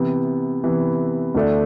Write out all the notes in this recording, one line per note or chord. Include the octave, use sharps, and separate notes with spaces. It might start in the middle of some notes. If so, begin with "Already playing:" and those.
Already playing: C3 E3 B3
C3 E3 B3
D2 D3 A3 D4